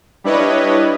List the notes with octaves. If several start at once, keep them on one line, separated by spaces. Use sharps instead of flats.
G3 D4 E4 B4 C#5 D#5